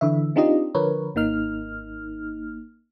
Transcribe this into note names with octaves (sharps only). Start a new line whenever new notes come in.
D3 E3 E5
C4 D4 D#4 F4 G4 D#5
D3 F3 A#4 B4 C#5
G#1 A#3 D#4 F6